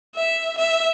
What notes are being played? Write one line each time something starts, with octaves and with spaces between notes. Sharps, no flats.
E5
E5